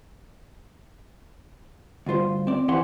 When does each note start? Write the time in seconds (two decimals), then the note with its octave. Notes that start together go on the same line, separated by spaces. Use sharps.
2.06 D2 G2 F4 C5
2.47 C4 D5
2.68 F2 E3 G4 C5 F#5 C6